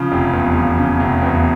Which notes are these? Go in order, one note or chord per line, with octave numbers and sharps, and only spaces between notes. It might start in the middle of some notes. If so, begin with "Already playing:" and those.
Already playing: C#3 F3
F1
E2
F3
C#3
F1
E2